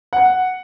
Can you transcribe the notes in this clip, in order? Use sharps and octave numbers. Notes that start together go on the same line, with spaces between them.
F#5